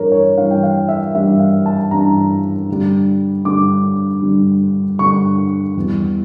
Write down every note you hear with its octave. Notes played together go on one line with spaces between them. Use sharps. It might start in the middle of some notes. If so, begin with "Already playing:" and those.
Already playing: G2 E3 G3 A#4 C#5
C#5
G2 E3 G3 F5
G5
F5
E5
G2 E3 G3 E5
F5
A5
G2 E3 G3 A#5
G2 D3 G3
G2 D3 G3 D6
G2 D3 G3
G2 D3 G3 C#6
E2 E3 G3